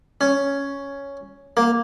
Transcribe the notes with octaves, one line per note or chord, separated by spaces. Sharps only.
C#4
A#3